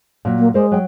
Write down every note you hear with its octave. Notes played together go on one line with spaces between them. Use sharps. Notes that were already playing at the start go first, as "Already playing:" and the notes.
A#2 F#3
A#3
G#3 A#4 C5 D5
F#3 G5